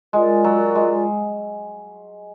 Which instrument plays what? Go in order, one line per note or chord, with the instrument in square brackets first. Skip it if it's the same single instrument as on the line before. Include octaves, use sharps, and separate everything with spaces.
[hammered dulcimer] G#3 [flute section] F4 A#4 D5
[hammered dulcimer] F#3
G#3